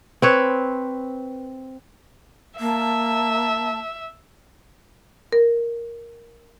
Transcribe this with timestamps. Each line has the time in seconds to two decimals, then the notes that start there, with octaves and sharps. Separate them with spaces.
0.22 C4 B4 C#5
2.60 A#3 E5 A5
5.32 A#4